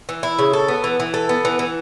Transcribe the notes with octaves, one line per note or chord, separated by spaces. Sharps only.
E3
E4
C#3
A4
B3
E3
E3
A4
B3
E3
E3